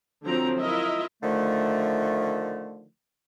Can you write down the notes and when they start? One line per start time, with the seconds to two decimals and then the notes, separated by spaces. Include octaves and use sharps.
0.25 D3 F3 F#3 C4 A#5
0.59 E4 F4 A#4 D#5 E5
1.22 D3 D#3 F3 A3